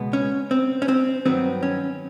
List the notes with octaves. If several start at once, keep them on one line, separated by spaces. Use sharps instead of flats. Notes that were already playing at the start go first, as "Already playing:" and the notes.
Already playing: C#2 B2 G#3 B3
C#4
C4
C#4
C4
G2 D#3 F#3 B3 C4
C#4